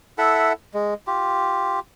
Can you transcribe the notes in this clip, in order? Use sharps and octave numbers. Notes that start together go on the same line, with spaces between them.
E4 A4 E5 F#5
G#3
F4 G4